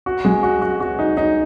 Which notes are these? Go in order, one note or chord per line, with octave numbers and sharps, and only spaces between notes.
F#4
G#3
F#4
F#4
F#4
D#4
D#4